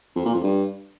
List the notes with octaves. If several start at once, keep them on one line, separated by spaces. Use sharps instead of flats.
F2
A#2
F2
G2